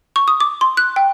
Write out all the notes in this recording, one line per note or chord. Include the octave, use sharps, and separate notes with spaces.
C#6
D#6
D6
C6
F#6
G5